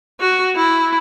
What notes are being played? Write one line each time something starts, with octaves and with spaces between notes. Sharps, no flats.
F#4
E4